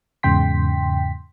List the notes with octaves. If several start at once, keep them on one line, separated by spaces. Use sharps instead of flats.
E2 G#2 C#3 G5 C6 B6